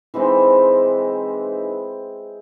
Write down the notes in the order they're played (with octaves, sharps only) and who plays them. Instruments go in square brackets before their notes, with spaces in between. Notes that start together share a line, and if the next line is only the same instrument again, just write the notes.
[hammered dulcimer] E3 G#3 C4 D#4